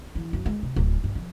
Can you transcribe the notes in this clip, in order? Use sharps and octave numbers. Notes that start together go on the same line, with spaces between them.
E3
F#2
G#3
C3
D1
G2
F2